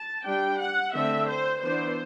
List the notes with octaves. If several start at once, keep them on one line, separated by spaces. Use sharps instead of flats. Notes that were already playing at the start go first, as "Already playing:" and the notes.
Already playing: A5
G3 D4 G5
F#5
D3 A3 C4 E5
C5
E3 B3 D4 C5